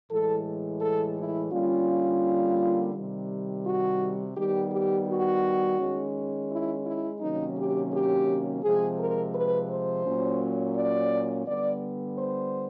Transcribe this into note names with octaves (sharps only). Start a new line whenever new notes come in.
A2 E3 G#3 A4
A4
E4
D3 G3 A#3 C#4 F4
C3 D#3 G3
F#4
D#3 G3 B3 G4
G4
F#4
D#3 G#3 C#4
E4
E4
C3 D#3 F#3 A#3 C#4 D#4
G4
G4
C3 F3 G#3 C4 G#4
A#4
B4
C5
A#2 F#3 A#3 C#4
D5
D3 G3 B3 D5
C5